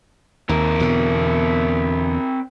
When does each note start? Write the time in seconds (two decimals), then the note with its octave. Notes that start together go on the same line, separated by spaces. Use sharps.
0.49 D#2 C4 A#4
0.80 E2 B2 D3